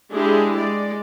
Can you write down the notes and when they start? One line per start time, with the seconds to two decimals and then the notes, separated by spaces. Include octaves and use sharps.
0.12 G#3 D4 E4 G4 G#4
0.58 G#3 D5